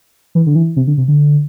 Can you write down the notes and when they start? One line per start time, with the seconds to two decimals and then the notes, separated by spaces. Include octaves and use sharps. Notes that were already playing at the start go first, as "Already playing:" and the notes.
0.35 E3
0.46 D3
0.55 E3
0.76 C3
0.87 D3
0.97 C3
1.08 D3